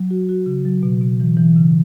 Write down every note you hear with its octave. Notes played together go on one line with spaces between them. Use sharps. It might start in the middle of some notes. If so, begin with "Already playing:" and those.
Already playing: F#3
F#4
F#4
C#3
F#3
B2
B2
E3
E3
C#3